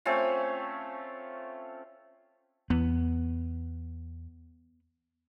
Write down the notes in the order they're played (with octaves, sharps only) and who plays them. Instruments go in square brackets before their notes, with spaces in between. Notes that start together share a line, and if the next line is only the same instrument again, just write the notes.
[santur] A3 C4 C#4 F4
[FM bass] E2 [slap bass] B3